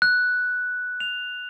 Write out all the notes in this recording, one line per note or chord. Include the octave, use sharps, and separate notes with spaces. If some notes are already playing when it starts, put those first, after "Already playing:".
F#6
F7